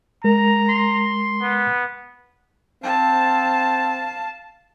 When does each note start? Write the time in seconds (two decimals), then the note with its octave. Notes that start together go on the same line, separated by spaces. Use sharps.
0.24 G#3 A#4 A#5
0.69 C6
1.42 B3
2.83 C4 F5 A5